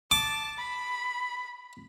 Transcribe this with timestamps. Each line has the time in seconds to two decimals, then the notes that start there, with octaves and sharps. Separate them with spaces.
0.11 A5 D6
0.58 B5